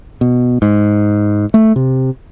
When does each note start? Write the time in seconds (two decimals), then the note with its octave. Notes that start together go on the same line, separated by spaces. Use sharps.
0.21 B2
0.62 G#2
1.54 A3
1.76 C3